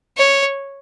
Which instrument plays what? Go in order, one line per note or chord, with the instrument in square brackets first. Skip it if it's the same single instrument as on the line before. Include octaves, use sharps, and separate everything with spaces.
[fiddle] C#5